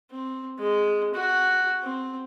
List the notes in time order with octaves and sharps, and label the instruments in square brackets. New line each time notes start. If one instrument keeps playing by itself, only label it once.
[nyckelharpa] C4
G#3
F#4
C4